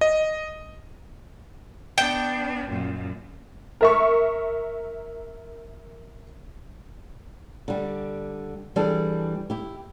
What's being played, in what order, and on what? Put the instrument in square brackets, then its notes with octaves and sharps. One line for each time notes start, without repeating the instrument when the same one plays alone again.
[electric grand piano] D#5
[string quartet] B3 D4 [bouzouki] G5
[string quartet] F#2 A#2
[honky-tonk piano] A#4 E5 C#6
[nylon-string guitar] D3 G3
E3 G3 D4 G#4 A4
E4 G4